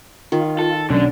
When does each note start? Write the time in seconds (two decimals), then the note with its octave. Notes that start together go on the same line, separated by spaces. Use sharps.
0.32 D#3 F4
0.59 A4
0.90 B1 D3 F#3 C#4 D4